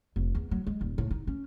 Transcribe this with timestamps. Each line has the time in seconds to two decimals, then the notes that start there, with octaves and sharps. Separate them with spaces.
0.16 F1
0.35 E2
0.51 F#3
0.67 G#3
0.81 D#1
0.98 A2
1.11 D#4
1.27 C#4